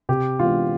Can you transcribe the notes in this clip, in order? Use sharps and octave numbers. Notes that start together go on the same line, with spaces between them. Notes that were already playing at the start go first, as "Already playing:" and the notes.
C3 G4
E3 G#3 B3 D4 F4